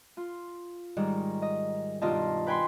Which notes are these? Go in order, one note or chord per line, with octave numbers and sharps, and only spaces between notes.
F4
G#2 D#3 G3
D#5
G2 B2 D#3 F4 D#5 A5
B4 G5 G#5 B5 C6